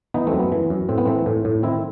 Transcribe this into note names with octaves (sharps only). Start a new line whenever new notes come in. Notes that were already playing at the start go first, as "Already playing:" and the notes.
E3 B3 D#4
A3 C4
F#2
B3
E3
F#2
A2 C4
B3
E3 A3 C4
A2
A2
D#3 C4 E4